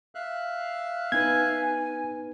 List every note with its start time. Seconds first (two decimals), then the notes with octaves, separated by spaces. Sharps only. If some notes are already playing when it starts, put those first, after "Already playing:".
0.15 E5 F5 F#6
1.12 B3 D#4 B4 G#5 G#6